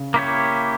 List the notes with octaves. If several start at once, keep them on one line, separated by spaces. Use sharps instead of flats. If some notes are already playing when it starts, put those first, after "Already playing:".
Already playing: C#3
A#3 E4 G4 C#5